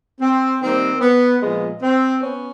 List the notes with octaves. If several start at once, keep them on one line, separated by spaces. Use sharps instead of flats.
C4
D#3 G3 A#3 C4
B3
A#2 F3 G#3 B3
C4
B3 C#4